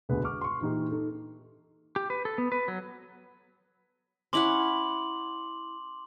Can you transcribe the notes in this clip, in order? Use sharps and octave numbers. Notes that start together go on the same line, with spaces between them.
E1 D2 B2 D3 G#4 B4
C#6 D6 F6
C6 C#6
A#2 E3 D#4 G4
D#4 A4
G4
B4
A4
B3
B4
F#3
C#4 E4 F#5 C6 D6 F#7